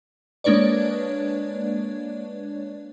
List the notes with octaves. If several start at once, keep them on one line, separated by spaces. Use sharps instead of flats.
G#3 A#3 D4 B4 C#5 D5